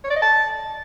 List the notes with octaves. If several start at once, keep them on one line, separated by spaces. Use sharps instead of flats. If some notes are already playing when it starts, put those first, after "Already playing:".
C#5
D5
D#5
A5